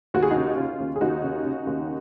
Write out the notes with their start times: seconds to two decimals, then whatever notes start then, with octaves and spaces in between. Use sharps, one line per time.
0.14 D#2 F#4
0.23 G#4
0.30 D#4 F#4
0.36 C#3
0.58 C#3 F4
0.80 D#2
0.96 G#4
1.01 D#2 D#4 F#4
1.23 C#3
1.45 C#3
1.67 D#2